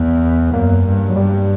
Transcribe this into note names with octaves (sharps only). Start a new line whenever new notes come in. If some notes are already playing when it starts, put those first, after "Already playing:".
Already playing: E2 B3
F#2 A#3
G2
F#3
G2 G3